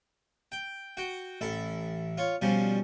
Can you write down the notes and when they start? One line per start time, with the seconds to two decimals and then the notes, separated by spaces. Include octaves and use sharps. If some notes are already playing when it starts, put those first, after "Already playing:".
0.52 G5
0.97 F#4 G5
1.41 A1 E4 A4
2.18 F4 C#5
2.41 B2 F3 G3 C#4